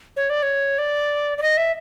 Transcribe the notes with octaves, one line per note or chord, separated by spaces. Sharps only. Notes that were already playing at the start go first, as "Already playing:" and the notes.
C#5
D5
C#5
D5
D5
D#5
E5